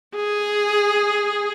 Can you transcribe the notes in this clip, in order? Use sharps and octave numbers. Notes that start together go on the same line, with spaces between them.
G#4